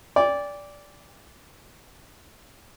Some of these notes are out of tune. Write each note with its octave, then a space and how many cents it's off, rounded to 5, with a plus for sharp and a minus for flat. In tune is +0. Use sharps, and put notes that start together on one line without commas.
D5 -15 G5 +40